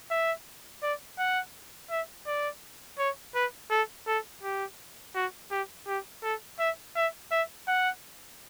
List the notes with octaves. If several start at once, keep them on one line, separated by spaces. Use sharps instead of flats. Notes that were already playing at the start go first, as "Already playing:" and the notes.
E5
D5
F#5
E5
D5
C#5
B4
A4
A4
G4
F#4
G4
G4
A4
E5
E5
E5
F#5